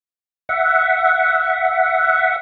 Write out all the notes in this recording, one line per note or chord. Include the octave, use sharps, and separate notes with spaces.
E5 F#5